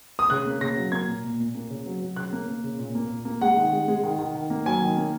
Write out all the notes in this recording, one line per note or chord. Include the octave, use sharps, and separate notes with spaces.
D#6
C#3 F#6
A#3
C#3 A#6
F#3
A#3 G#6
A#2
A#2
A#2
A#3
C#3
F#3
F#3
C#3 F#6
A#3
A#3
C#3
A#2
A#3
A#2
A#3
G#3 F#5
D#3
G#3
G#3
D#3
D#3
D#3
A#3
F#3 G#5
D#3
A#3